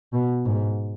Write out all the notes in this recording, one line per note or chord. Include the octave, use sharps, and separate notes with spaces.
B2
G#2